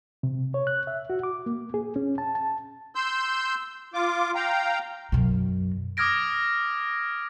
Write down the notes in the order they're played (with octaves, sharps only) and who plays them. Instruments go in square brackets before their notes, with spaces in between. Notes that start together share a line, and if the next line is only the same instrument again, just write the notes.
[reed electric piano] C3
C#5
F#6
E5
F#4
D6
A#3
G#4
C#4
A5
A5
[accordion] C6 E6 G6
F4 D6
F5 G5 A#5
[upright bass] F#2 B2
[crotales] D6 D#6 F6 G#6 A#6 D7